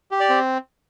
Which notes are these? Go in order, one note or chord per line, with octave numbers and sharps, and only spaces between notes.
G4
D5
C4